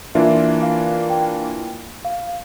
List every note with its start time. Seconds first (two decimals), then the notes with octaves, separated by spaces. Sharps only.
0.15 E3 A#3 D4 F4 E5
0.62 F5
1.10 G5
2.05 F5